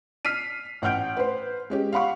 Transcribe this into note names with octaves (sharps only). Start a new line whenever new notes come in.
F6 B6 C7 D#7
A1 F#5 G5 F6 G6 D7
B4 C5
G#3 C#4 G4
F5 F#5 B5 C#6